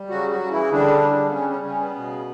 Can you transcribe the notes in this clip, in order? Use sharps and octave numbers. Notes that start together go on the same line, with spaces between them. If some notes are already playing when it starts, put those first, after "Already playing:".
Already playing: G3
C#3 F#3 F#4
F#3 F#4
C#3
E3 E4
D3 G3 D4
C#3
B3
G3 C#4
C#4
C#3 C#4
B3
B2